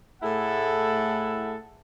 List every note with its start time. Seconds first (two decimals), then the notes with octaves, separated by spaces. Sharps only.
0.22 A2 A3 E4 G#4 A4 F#5